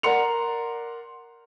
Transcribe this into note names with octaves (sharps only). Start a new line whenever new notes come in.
A#4 D5 F#5 C6 C#7 F7